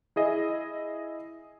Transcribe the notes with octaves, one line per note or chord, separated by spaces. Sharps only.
E4 G#4 D#5 E5